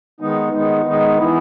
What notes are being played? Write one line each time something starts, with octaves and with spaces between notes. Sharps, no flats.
D#3 G#3 B3 D#4
D#3 G#3 B3 D#4
D#3 G#3 B3 D#4
E3 B3 E4